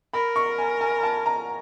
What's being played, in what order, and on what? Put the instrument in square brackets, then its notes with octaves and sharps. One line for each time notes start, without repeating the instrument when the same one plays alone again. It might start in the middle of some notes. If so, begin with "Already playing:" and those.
[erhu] A#4 [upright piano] B5
[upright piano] C#6
G#5
G#5
A5
A#5